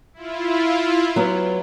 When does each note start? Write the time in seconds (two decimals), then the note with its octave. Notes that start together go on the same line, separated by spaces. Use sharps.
0.14 E4 F4
1.16 F#3 B3